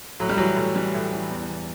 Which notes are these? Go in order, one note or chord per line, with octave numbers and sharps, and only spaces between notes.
A2 F#3
G3
E3 F#3
A2
E3 G3
A2
E3
E2
E2